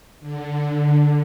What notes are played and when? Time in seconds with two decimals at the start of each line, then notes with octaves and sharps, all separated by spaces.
0.20 D3